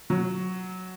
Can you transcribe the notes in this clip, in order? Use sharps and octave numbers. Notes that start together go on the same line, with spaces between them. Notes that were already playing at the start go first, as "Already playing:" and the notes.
F#3